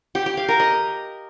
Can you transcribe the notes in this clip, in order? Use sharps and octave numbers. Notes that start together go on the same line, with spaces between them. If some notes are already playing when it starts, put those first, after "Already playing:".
G4
G4
F5
A#4
D#5